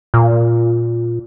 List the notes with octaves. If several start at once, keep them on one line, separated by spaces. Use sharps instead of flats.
A#2